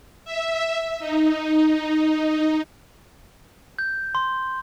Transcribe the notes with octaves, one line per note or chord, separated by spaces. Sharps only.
E5
D#4
G6
C6